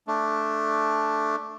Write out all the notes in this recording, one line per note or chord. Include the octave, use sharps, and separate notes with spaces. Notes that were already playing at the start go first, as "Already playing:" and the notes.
A3 D4